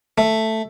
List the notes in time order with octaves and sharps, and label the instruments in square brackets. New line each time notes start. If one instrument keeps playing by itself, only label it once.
[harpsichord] A3